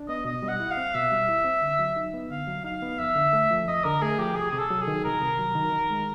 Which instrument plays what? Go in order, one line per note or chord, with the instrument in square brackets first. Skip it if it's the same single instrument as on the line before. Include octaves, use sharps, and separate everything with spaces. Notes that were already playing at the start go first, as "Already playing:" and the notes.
Already playing: [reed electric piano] D4
[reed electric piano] B3 [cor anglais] D#5
[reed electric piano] B2 [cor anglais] D#5
[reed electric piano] G3
[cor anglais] F#5
[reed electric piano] E4
[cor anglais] F5
[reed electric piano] C4
[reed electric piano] B2 [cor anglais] E5
[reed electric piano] G3
E4
C4
D3
F#3
D#4
B3
[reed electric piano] D3 [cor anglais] F5
[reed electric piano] F#3
[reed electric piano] D#4 [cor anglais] F5
[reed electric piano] B3
[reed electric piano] F2 [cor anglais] E5
[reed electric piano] D3
A3
F3
[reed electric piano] F2 [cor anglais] D#5
[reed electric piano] D3 [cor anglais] A#4
[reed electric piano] A3 [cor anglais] G#4
[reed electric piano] F3 [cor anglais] G4
[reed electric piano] C2 [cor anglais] G#4
[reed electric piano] C3 [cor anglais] G#4
[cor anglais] A4
[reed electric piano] F#3
[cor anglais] G#4
[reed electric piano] D#3
[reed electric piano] C2 [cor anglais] A#4
[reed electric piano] C3
F#3
D#3
D#3
G#3